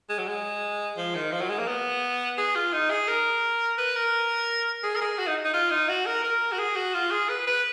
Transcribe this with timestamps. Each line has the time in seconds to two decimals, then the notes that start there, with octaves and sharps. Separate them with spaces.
0.09 G#3
0.19 F#3
0.27 G#3
0.97 F3
1.15 D#3
1.32 F3
1.41 F#3
1.50 G#3
1.59 A#3
1.68 B3
2.38 G#4
2.56 F4
2.73 D#4
2.90 G#4
3.08 A#4
3.78 B4
3.96 A#4
4.84 G#4
4.96 A#4
5.01 G#4
5.19 F#4
5.27 D#4
5.45 D#4
5.54 F4
5.71 D#4
5.89 F#4
6.06 A#4
6.24 A#4
6.52 F#4
6.59 G#4
6.76 F#4
6.94 F4
7.11 G#4
7.29 B4
7.47 B4